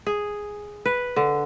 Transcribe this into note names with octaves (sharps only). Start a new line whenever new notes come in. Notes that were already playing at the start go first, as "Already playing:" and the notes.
G#4
B4
D3